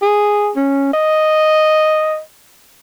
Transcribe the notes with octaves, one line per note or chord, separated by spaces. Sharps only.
G#4
C#4
D#5